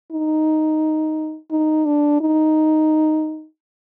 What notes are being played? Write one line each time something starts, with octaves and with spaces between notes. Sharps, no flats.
D#4
D#4
D4
D#4